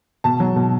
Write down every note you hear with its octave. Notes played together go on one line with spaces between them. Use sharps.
B2 A5
F#3
B2